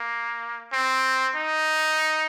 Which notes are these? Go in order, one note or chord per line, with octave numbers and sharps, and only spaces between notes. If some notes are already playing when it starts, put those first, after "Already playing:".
Already playing: A#3
C4
D#4